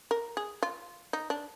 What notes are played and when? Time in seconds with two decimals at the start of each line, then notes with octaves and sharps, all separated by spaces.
0.11 A#4
0.37 G#4
0.63 F4
1.13 D#4
1.30 D4